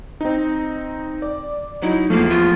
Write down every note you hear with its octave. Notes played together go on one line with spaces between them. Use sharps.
C4 D#4
D5
F#3 D#4 E4
E2 F3 A3 A#3
F4